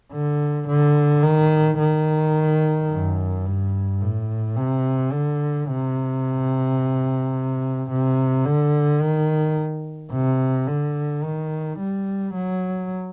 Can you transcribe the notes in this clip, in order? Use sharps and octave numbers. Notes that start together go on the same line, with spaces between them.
D3
D3
D#3
D#3
F#2
G2
A2
C3
D3
C3
C3
D3
D#3
C3
D3
D#3
G3
F#3